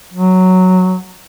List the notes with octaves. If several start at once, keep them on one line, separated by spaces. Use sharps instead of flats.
F#3